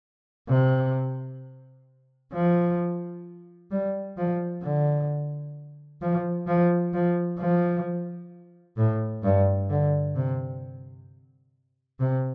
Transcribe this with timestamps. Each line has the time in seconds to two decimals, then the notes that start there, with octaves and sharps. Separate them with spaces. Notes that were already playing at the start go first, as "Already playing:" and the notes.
0.49 C3
2.33 F3
3.71 G3
4.17 F3
4.63 D3
6.02 F3
6.47 F3
6.94 F3
7.39 F3
8.77 A2
9.23 G2
9.70 D3
10.16 C3
12.00 C3